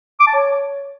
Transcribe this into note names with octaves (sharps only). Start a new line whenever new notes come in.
D6
A5
C#5